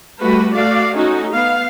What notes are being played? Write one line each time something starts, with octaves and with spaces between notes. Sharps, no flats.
G3 A3 F#4 B4
A3 F#4 D5 F5
A3 C#4 D#4 F#4
B3 F5